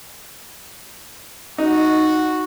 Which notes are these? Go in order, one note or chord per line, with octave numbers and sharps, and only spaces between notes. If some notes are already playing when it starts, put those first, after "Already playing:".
D#4 F#4